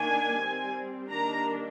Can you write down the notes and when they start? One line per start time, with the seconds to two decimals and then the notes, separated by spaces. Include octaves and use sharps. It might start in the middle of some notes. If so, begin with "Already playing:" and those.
Already playing: D#3 A#3 D4 G#5
0.38 G3 C4
1.10 D#3 G3 A#3 D4 A#5